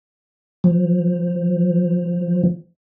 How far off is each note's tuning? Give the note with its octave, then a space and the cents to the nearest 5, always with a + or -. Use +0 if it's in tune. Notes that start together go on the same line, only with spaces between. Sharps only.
F3 +0